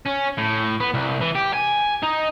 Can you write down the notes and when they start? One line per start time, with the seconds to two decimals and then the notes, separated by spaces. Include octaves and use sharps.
0.06 C#4
0.38 A2
0.80 B3
0.94 C2
1.21 E3
1.36 G4
1.54 G#5
2.03 D#4